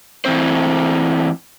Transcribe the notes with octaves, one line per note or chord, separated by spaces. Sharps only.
E3 A3 C4 C5